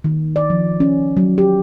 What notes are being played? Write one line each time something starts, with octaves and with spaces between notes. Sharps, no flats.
D#3
D5
F3
C#4
F#3
G4